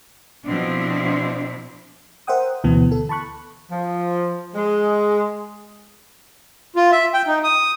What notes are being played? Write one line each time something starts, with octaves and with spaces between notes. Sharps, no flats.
B2 F3 C4 D4 E4
A#4 C5 E5 F#5 G5 D#6
D2 B2 E3 B3
A4
A5 B5 C#6 F#6
F3
G#3
F4
E5
G5
D#4
D#6